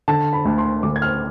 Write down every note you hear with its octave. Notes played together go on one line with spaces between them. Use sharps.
D3 A5
B5
D2
C6
D2 D6
G#6
F6